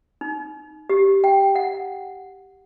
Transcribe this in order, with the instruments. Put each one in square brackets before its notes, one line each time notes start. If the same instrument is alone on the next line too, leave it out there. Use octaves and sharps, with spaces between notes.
[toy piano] D#4
G4
G5
F#5